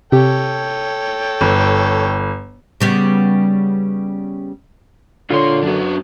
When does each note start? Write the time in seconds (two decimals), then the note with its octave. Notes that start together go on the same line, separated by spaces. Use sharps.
0.12 C3 G4 A4 C#5 G5
1.41 G1
2.81 C#3 G3 B3
5.30 A#2 D3 F4 B4 C#5 C6
5.63 F#2 F#3 B3 D4